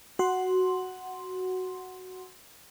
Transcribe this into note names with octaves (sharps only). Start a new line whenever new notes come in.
F#4 F#5 C6